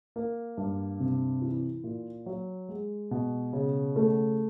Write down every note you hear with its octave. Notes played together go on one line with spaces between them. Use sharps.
A#3
G2
C3
E3
A#2
F#3
G#3
B2
C#3
A3